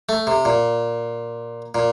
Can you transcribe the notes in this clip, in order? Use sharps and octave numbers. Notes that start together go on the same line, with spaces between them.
A3
C3
A#2
A#2